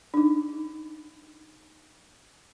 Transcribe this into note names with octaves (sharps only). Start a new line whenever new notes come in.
D4 D#4